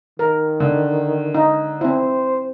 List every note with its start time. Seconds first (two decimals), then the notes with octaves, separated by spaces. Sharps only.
0.19 D#3 A#4
0.60 D3
1.35 D#4
1.81 C4 E4 C5